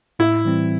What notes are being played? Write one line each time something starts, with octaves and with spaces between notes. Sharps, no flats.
A2 E4
E3 G3 C4